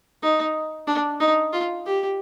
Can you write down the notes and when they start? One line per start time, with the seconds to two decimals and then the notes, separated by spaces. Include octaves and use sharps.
0.23 D#4
0.87 D4
1.20 D#4
1.53 F4
1.86 G4